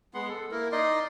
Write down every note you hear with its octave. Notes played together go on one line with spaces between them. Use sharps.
G#3 B3 F#5 C6
A4
A#3 E4 A#4
D#4 D5 D#5 C6